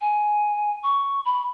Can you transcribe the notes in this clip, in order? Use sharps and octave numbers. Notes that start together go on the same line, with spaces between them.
G#5
C#6
B5